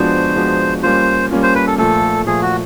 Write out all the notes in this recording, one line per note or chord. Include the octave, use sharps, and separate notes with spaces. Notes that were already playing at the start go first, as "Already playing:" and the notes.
Already playing: F3 G#3 B3 D4 F#4 C5
F3 G#3 B3 D4 F#4
G3 A#3 C#4 F4 C5
G3 A#3 C#4 F4
C5
B4
A4
A#2 F3 A3 A4
A#2 F3 A3 G#4
F#4